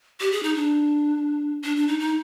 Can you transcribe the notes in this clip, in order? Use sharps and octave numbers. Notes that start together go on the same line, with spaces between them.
G4
G#4
D#4
D4
D4
D4
D#4
D#4